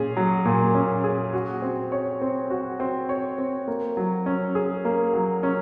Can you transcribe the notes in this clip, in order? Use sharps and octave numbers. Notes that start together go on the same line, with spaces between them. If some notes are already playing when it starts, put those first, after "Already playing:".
Already playing: A#2 C#4 G#4
F#3
A#2
C#4
G#4
F#4
C4
C#5
C4
F#4
C4
C#5
C4
A#3
F#3
C#4
G#4
A#3
F#3
C#4